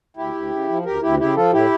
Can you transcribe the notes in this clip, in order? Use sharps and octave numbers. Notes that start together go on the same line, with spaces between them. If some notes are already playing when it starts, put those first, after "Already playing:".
D2 E4 G4
D2
C#3
F3
D2 G4 A#4
D2 E4 G4
C#3 E4 G4
F3 F4 A4
A2 E4 G4